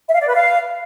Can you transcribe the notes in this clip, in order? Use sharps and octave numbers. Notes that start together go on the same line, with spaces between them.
E5
F5
D5
B4
F5